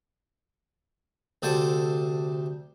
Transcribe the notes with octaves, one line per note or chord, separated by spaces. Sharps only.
D2 C3 A4 C5 D5